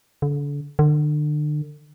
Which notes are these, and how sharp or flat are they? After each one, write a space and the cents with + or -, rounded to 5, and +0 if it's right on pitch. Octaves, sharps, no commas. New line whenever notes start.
D3 -35
D3 +35